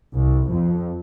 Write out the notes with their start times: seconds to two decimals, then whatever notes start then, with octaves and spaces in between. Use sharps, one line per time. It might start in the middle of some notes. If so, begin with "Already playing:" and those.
0.14 C2
0.49 F2